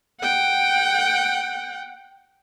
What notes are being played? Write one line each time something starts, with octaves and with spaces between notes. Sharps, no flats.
F#5 G5